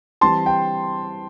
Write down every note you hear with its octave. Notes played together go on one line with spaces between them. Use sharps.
E3 G3 C4 A5 C6
G5